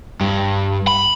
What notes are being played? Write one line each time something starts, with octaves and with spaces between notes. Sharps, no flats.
G2
B5